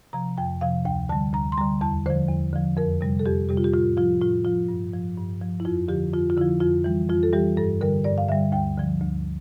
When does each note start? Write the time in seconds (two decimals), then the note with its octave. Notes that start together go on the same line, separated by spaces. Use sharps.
0.13 C3 F3 A#5
0.38 F2 G5
0.61 C3 F3 F5
0.85 D2 G5
1.09 D3 G3 A5
1.33 D2 A#5
1.52 C6
1.58 D3 G3 A#5
1.81 E2 A5
2.06 D3 F3 C5
2.29 E2
2.53 D3 F3
2.77 F2 A#4
3.01 C3 G3
3.19 A4
3.25 F2 G4
3.49 C3 G3 G4
3.57 F4
3.64 G4
3.73 A2 F4
3.97 F3 F4
4.21 A2 F4
4.45 F3 F4
4.69 G2
4.93 F3
5.17 G2
5.42 F3
5.60 E4
5.65 F2 F4
5.88 D3 F3 G4
6.13 F2 F4
6.30 F4
6.37 D3 F3 E4
6.61 F2 F4
6.84 E3 G3
7.10 F2 F4
7.23 A4
7.33 E3 G3 G4
7.57 G2 A4
7.81 D3 G3 A#4
8.04 G2 D5
8.18 F5
8.28 D3 G3 E5
8.52 D2 G5
8.77 D3 F3
9.01 D2